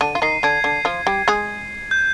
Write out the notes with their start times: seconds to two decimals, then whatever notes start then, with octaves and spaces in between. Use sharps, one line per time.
0.01 D3 D4 D#7
0.15 F4
0.22 D#3 D#4 C7
0.43 D3 D4 G#6
0.64 D3 D4
0.85 F3 F4
1.07 G3 G4
1.28 G#3 G#4
1.91 G6